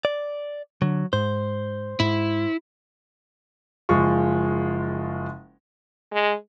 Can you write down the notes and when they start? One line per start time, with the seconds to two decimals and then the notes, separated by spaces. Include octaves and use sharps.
0.05 D5
0.82 D3 F#3
1.13 G#2 C5
2.00 G#2 E4
3.89 F#1 F3 G#3 F4 C#6
6.13 G#3